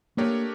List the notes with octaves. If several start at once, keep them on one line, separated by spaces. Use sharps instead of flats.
A3 A#3 D4 G4 A#4 C#5